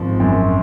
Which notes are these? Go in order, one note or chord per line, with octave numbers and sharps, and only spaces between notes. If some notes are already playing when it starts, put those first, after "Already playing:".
Already playing: G#1 F3
F#2